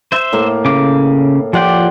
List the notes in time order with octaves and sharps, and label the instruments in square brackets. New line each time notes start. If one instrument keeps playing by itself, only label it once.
[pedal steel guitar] C5 E5
[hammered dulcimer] A2 A#3 A4
[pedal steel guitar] C#3 D6
[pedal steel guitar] F3 F#5 G5 [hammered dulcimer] F4 G4 D5